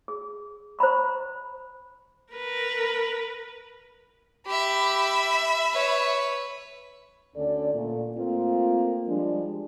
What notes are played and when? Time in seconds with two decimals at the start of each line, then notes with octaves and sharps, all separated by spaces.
0.08 G#4
0.79 C5 A#5 B5 C#6
2.33 A#4 B4
4.47 G4 E5 B5
5.73 B4 C#5
7.36 D2 D3 C#4 A4 D5
7.73 A#2 A3
8.17 A3 A#3 C4 F4
9.08 F3 G3 G#3 D4